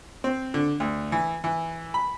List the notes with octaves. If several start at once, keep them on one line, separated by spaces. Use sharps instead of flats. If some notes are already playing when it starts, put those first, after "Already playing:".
C4
D3
D2
E3
E3
B5